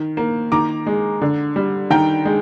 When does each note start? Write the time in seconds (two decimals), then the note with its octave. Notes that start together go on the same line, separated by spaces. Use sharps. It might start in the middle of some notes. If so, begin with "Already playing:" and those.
Already playing: D#3
0.17 A#3
0.52 D#3 A#5 D6
0.86 G#3
1.21 D3
1.56 G3
1.90 D#3 G5 A#5
2.25 G#3